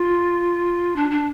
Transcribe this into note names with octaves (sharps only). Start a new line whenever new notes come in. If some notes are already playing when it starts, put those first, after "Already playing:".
Already playing: F4
D4
D4